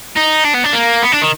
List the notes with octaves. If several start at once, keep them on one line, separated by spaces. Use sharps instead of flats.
D#4
D4
B3
D4
A#3
B3
D4
D#3